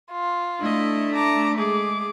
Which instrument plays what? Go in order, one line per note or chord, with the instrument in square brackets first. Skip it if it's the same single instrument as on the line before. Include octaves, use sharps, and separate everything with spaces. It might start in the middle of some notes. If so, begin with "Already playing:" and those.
[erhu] F4
[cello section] A3 [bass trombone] D4 [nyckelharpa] E4 D#5
[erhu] A5 [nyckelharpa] A#5 D6
[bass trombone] G#3 [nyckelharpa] G#4 [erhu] D6